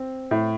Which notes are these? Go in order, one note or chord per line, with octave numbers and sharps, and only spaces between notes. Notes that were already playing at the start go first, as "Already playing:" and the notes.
Already playing: C4
A2